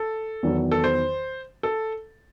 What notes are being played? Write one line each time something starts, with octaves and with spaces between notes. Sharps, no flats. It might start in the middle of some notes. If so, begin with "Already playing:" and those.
Already playing: A4
E2 D#3 F#3
A4
C5
A4